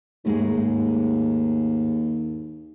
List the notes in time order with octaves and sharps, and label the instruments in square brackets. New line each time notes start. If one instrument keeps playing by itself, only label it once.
[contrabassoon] D#2 [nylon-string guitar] G#2 G#3 A3